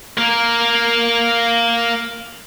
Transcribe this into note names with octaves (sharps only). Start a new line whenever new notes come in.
A#3 A#4